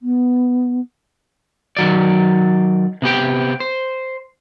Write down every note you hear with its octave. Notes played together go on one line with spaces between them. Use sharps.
B3
D#3 F#3 D5
C3 B3 G4 G5
C5